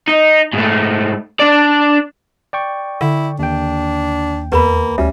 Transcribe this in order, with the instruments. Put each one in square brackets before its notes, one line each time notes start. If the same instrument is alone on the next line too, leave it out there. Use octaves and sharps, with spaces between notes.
[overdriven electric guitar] D#4
G#2 A3
D4 D5
[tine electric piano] D5 G5 C#6
[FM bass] D3 [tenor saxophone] E4
[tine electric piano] D#2 G5 [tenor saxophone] D4
[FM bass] E2 [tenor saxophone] A#3 [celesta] B4 B5
[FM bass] D2 [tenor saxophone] G3 [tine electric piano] C#4 [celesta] E5